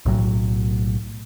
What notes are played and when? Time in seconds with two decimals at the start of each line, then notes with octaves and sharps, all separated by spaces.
0.06 B1 A2 F#3